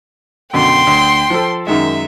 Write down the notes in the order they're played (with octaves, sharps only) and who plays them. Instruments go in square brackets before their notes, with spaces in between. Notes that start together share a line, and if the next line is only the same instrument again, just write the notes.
[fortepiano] F#2 B2 D3 [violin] G5 C6
[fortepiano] D2
F3 A4
[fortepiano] F#2 D#3 G#3 [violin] E5